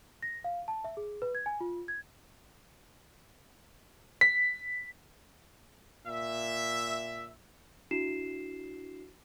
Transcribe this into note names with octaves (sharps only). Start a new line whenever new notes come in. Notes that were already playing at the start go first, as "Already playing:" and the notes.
A#6
F5
A5
E5
G#4
B4
G#6
G#5
F4
G#6
B6
A#2 E5
D4 E4 F#4 C7 E7